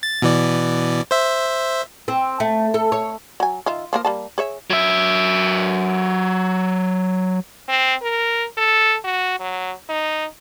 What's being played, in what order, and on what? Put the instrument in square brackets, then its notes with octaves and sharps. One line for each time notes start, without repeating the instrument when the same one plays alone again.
[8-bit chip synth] A6
B2 E3 D5
C5 E5
[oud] C4
A3
A4
C#5
[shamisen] F#3 G#5
D#3 F4 E5
F3 A#3 A#4
G3 A#3 A5
G#4 C#5 E5
[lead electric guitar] F#3 E5
[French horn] C4
A#4
A4
F#4
F#3
D#4